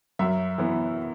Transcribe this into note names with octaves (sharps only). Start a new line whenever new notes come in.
F#2 E5
E3 B3